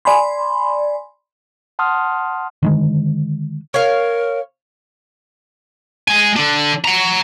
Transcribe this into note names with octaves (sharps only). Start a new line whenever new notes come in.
D5 G#5 B5 C6
F#5 A5 C6 D#6 F6
D3 D#3 G#3
A#4 C#5 F5
G#3 G#5
D3 D4
F#5 A#5